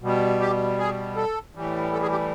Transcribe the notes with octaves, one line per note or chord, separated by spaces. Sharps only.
B2 G3
G4
G#4
A4
A2 E3 G3
A4
G#4
G4